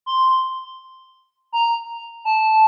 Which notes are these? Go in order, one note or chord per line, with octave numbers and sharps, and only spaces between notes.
C6
A#5
A5